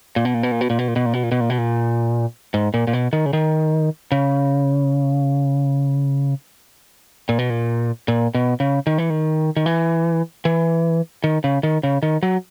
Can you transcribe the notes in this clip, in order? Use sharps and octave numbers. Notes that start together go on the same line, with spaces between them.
A#2
B2
A#2
B2
A#2
B2
A#2
B2
A#2
B2
A#2
B2
A#2
B2
A#2
B2
A#2
G#2
A#2
A#2
B2
D#3
C#3
D#3
C#3
A#2
B2
A#2
A#2
B2
C#3
D#3
E3
D#3
D#3
E3
E3
D#3
C#3
D#3
C#3
D#3
F#3